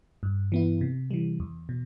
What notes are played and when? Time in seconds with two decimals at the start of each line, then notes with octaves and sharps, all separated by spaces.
0.23 G2
0.52 E3 B3 E4
0.81 C3
1.11 E3 G3
1.40 E2
1.69 B2